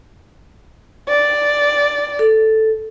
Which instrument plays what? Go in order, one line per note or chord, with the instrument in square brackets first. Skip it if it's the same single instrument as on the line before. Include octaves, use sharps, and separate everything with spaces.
[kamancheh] D5
[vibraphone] A4